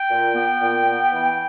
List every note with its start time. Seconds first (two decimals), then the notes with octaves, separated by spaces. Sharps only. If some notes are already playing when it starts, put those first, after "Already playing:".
Already playing: G5
0.10 A#2
0.35 B3
0.62 A#2
0.86 B3
1.13 E3